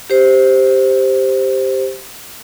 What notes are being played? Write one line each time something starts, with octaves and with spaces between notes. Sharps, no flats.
G4 C5